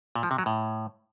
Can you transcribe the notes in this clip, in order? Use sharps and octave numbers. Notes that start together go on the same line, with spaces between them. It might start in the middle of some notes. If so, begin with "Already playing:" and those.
A#2
F3
C3
F#3
A2